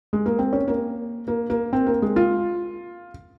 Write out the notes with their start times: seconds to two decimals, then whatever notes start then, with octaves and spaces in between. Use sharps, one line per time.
0.13 G#3
0.26 A#3
0.39 C4
0.53 C#4
0.68 A#3
1.28 A#3
1.50 A#3
1.73 C4
1.87 A#3
2.02 G#3
2.16 F4